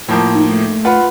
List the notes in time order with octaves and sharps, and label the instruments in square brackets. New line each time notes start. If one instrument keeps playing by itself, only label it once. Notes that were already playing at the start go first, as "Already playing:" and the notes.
[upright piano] A2 F3 A#3
[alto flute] D#4
A3
[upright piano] F4 B4 F#5